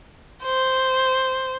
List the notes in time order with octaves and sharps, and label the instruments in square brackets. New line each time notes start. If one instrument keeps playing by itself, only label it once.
[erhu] C5